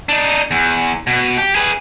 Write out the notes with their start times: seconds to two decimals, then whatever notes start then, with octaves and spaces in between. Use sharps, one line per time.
0.09 D4 D#4
0.51 E2
1.07 B2
1.38 G4
1.55 G#4 B4